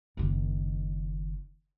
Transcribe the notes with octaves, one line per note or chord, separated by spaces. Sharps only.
F#1 D#3